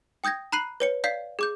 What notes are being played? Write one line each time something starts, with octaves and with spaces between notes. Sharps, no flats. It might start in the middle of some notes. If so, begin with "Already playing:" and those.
G5 D#6 G6 G#6 A#6
A#5 B5 F#6 C7 D#7 F#7
B4 C#5 C#7
D5 F5 G6 B6 C7
G#4 D6 G6